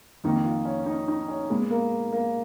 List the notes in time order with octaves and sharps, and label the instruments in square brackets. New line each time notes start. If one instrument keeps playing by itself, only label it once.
[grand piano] F2 D#3 A#3 [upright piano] D#4
[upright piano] F4
C#4
D#4
D#4
C#4
[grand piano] A#2 G#3 B3
[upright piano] A#3
A#3